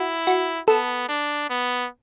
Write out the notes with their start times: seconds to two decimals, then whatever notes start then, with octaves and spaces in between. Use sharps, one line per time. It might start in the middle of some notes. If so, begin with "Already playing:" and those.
Already playing: E4 F#4
0.27 F#4
0.68 B3 A4
1.09 D4
1.50 B3